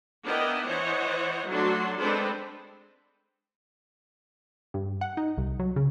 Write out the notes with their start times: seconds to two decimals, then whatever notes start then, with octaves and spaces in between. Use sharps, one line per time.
0.24 B3 D4 E4 A#4 D#5 G5
0.66 E3 C5 C#5 D#5 F#5
1.47 F#3 A3 D4 F#4 C6
1.98 G#3 C4 D4 A4 B4 C5
4.74 G2
5.01 F#5
5.17 D#4
5.37 C2
5.59 F#3
5.76 C#3